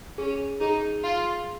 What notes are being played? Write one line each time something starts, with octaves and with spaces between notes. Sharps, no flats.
C#4 G#4
D#4 G#4
F4 F5